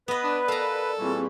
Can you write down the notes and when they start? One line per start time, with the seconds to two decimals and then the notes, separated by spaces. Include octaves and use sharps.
0.08 B3 B4 D#5
0.24 D4 D5
0.48 A4 A#4 D5 F5 A#5
0.99 A#2 E3 G3 C4 G#4 C#6